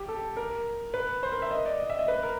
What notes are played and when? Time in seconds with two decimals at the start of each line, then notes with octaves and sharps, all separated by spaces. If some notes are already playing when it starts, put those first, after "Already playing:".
Already playing: G4
0.08 A4
0.37 A#4
0.94 B4
1.23 C5
1.32 A#4
1.42 E5
1.51 D#5
1.66 D5
1.80 D#5
1.90 E5
1.99 D#5
2.08 B4
2.23 A#4